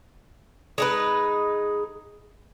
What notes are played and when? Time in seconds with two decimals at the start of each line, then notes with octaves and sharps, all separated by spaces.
0.78 G#3 D#4 B4